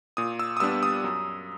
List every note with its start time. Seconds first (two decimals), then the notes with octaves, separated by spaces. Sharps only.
0.17 A#2 D#6
0.39 E6
0.57 D#6
0.60 G3 B3 D4 E6
0.83 D#6
1.04 F#2